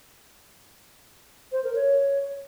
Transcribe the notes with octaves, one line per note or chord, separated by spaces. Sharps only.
C5
A#4
C#5